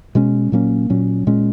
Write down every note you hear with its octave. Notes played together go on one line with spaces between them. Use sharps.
B2 G#3 C#4
A#2 F#3 A#3 C#4
A#2 F#3 C#4
A#2 G#3 C#4